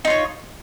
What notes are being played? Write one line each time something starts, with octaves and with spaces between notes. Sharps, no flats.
D#4 F4 C#5